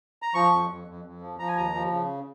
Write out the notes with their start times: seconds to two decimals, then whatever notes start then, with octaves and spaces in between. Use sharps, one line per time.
0.22 A#5
0.34 F3 C#6
0.52 F2
0.70 F2
0.87 F2
1.05 F2
1.21 F3
1.39 F3 A#5
1.48 G#5
1.56 D#2 A#5
1.74 F3
1.92 C#3